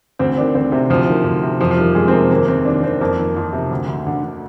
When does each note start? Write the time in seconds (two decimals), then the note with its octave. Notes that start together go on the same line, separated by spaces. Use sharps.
0.19 D2 C4
0.38 D#3 D4
0.55 D2 C4
0.72 C3
0.90 D2 F3
1.07 D#3
1.25 D2
1.43 C3
1.61 F2 F3
1.71 F3
1.78 D#3 G3
1.95 F2 G#3
2.08 C4
2.13 C3 A#3
2.31 D#2 A#3
2.48 D#2 C4
2.65 D#3 D4
2.83 D#3 C4
3.01 F2 A#3
3.18 D#3
3.36 F2
3.53 C3
3.71 D2
3.88 D2
4.07 D3
4.24 D3